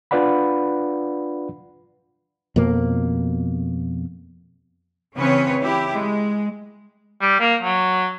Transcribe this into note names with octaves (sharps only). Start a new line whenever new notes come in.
D4 F4 B4 D5 F#5 B5
F2 B2 A#3
C#3 E3 C4 C#4 B4 C#5
E4 G4
G#3
G3
A#3
F#3